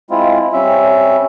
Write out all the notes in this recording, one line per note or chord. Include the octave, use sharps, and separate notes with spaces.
G#3 C4 E4 F4
G3 C4 C#4 E5